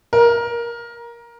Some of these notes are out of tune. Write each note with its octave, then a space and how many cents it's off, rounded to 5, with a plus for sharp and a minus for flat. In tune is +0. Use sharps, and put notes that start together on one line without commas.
A#4 +15